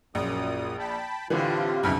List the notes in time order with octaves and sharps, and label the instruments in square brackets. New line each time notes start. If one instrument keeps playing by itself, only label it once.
[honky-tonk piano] A#1 [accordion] F#2 A#2 D#6
[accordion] G5 A5 B5
[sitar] A2 D3 G3 [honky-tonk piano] E3 [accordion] C4 F4
[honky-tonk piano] B1 F2 C#3 [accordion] E4 B5 F6